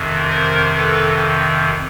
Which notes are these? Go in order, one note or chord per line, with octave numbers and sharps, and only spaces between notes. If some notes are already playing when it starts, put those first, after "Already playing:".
Already playing: F2 C3 D#3
A#4 C5
A4 B4